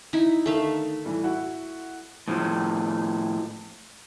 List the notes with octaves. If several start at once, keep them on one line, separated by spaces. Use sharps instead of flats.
D#4 E4
D3 D#3 A3 E5 F5
A2 E3 G3
E4 F#4
A2 F3